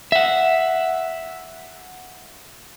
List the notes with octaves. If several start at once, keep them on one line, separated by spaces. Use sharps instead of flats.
E5 F#5